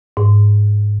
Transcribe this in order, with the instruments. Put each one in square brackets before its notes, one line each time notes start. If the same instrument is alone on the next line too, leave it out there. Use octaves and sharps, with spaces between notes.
[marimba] G#2